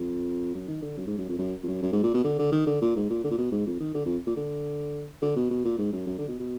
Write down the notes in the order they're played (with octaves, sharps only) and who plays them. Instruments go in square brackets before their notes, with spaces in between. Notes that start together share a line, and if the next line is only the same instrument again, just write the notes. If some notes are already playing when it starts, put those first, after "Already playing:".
Already playing: [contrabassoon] F2
F#2
D#3
D3
F#2
G#2
F#2
F2
F#2
F2
F#2
F#2
G#2
A#2
B2
D3
D3
D#3
D3
A#2
G#2
A#2
D3
A#2
B2
G#2
F2
D#3
D3
F2
A#2
D3
D3
B2
B2
A#2
G#2
F#2
F#2
D3
B2
B2